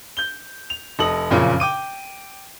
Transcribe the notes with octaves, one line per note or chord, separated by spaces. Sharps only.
G6 G7
F7
F1 A4 D#5 D#6 F#7
F#1 F2 A#2 C#3
G5 D6 D#7